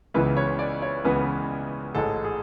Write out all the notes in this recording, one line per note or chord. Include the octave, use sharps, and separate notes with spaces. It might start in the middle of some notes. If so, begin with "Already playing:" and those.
C#2 C#3 E3 B3 E4 B4
C#5
D5
C#5
C#2 C#3 E3 B3 E4 B4
A1 G#2 G#3 A4
G#4